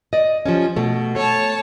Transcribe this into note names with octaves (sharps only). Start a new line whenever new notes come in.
D5 D#5
F3 G3 C#4
B2 A3
A3 C#5 A5